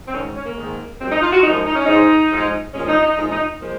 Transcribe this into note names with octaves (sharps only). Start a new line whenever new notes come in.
C4
G#2 D#3 G#3 C#4
C#4
A#3
G#2 D#3 G#3
F#2 F3 G#3 C4
D#4
F4
F#4
F#2 F3 G#3 D#4
D#4
C#4
G#2 F3 G#3 D#4
G#2 F3 G#3
A#2 F3 G#3 C#4
D#4
D#4
A#2 F3 G#3 D#4
D#4
F3 G#3 A#3